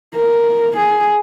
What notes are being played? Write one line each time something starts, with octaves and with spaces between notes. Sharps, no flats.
A#4
G#4